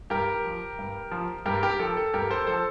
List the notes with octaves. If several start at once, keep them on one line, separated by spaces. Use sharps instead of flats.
G2 G4 A#4
F3
G2
F3
G2 G4 A#4
G4 A#4
F3 A4
A4
G2 G4 A#4
A4 C5
F3 A4 C5